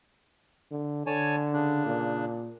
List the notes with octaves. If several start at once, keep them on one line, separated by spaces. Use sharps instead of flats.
D3
D3 C#5 G#5 A5
C#3 D4
A#2